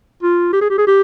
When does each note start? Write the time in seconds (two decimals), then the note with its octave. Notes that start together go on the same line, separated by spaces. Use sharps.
0.23 F4
0.53 G4
0.61 G#4
0.70 G4
0.78 G#4
0.87 G4